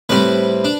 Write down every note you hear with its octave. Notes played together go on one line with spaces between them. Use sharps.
A2 G3 C4 B4
D4